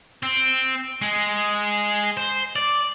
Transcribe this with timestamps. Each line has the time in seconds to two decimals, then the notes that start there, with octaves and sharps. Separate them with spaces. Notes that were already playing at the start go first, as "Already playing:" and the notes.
0.23 C4
1.02 G#3
2.17 C5
2.56 D5